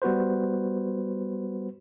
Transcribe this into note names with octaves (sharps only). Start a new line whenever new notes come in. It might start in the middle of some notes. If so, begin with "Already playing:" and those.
G3 B3 F#4 B4 C5